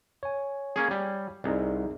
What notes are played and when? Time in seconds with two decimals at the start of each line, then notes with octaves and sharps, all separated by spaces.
0.23 C#5 G#5
0.76 A#3 C#4 G#4
0.91 G3
1.44 C2 D#4 G#4 D5